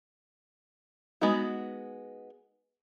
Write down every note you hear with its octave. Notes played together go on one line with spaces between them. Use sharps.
G#3 B3 D#4 F#4